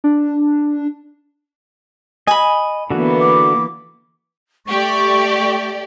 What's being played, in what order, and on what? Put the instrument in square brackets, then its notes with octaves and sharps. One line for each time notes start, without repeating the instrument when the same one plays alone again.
[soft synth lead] D4
[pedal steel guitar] D#5 [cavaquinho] G#5 B5
[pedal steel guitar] D3 F#4 [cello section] E3 A#3 B3
[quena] D6
[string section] A3 G4 D5 [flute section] C#6